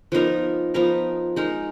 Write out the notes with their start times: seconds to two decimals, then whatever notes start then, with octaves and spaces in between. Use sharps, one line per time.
0.12 F3 B3 D#4 A#4
0.74 F3 B3 D#4 A#4
1.36 G#3 D#4 A#4